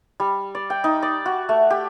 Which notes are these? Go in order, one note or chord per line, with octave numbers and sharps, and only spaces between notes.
G3
D5
G5
D#4
D5
F#4
A3
G4